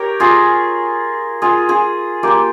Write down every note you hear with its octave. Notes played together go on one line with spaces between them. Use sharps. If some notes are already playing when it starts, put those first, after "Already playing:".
Already playing: G4 A#4 C#5
F4 G#4
F4 G#4
F4 G#4
A#3 F4 G4